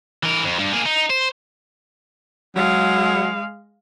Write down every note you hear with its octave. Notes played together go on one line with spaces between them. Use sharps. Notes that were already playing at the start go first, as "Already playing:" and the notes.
E3 A#4
F2
G2
A#3 G#4
D#4
C5
F#3 G#3 F5